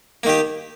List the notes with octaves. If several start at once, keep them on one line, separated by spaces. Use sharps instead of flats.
D#3 A#3 G4